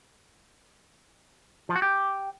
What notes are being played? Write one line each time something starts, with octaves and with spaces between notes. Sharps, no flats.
F3
F#4
G4